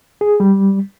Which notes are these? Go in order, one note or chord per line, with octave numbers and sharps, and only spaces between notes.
G#4
G3